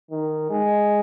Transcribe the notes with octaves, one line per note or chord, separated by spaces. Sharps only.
D#3
G#3